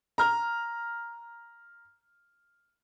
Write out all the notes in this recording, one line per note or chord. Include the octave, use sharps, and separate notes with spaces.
A#5 F6